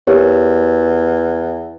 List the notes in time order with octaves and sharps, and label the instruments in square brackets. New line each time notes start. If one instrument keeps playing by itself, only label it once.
[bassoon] E2 [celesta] G4 A#4 C#5